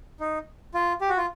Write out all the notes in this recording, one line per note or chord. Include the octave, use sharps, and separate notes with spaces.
D#4
F4
G4
F#4
F4